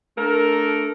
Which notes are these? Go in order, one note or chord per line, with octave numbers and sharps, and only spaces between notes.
A3 D4 A4 A#4